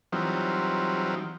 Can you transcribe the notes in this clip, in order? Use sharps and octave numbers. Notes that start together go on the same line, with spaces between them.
E3 F#3 G3 C4 D#4 F4